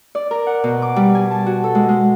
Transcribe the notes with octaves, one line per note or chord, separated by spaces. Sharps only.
D5
A#4
F#5
B2
D6
G3
G#5
A5
F#4
A4
G#3
G#3